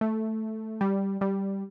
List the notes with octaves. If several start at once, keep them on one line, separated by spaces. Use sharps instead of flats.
A3
G3
G3